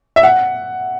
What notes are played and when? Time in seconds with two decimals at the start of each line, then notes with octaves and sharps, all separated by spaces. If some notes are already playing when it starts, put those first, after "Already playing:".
0.16 E5
0.23 F#5